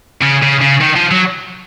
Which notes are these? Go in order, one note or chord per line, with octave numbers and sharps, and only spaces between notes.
C#3
C#3
C#3
D#3
F3
F#3